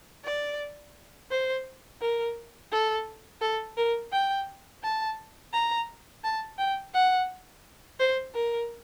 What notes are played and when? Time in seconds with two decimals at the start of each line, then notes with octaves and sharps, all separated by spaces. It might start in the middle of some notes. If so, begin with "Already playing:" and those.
0.24 D5
1.30 C5
2.01 A#4
2.72 A4
3.41 A4
3.77 A#4
4.12 G5
4.83 A5
5.53 A#5
6.24 A5
6.58 G5
6.94 F#5
8.00 C5
8.34 A#4